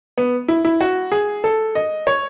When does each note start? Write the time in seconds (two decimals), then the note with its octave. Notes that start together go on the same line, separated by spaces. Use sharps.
0.18 B3
0.48 E4
0.65 E4
0.81 F#4
1.12 G#4
1.44 A4
1.75 D#5
2.07 C#5